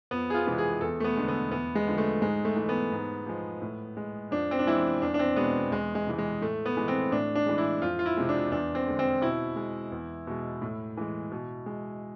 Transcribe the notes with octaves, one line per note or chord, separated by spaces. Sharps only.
F2 B3
G#4
F4
C3 E3 G#3
G#4
E2 A4
A3
B3
D3 G#3
B3
E2 B3
G#3
D3 F3
A3
G#2 G#3
A3
E3 G#3
B3
G#2
F3 G#3
A2
G#3
F2 D4
C4
D4
E3 G#3 E4
E2 D4
D4
C4
B2 G#3 B3
E2 G#3
G#3
C3 E3 G#3
G#3
A2 A3
B3
E3 G#3
C4
A2 D4
D4
E3 G#3
E4
F2 F4
F4
E4
C3 G#3
D4
E2 D4
C4
D3 G#3
C4
B2 E4
G#3
E2
B2 G#3
A2
E3 G#3
B2
G#3